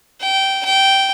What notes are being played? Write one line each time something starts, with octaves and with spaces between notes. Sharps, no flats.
G5
G5